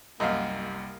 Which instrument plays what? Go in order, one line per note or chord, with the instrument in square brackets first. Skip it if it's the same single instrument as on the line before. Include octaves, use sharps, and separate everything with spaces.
[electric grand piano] C2 G3 [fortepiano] F#2 [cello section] A#3 [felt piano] D#5 F5